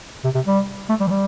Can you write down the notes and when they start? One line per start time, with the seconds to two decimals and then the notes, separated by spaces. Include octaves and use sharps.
0.24 C3
0.35 C3
0.46 G3
0.89 A3
1.00 G3
1.07 E3
1.11 G3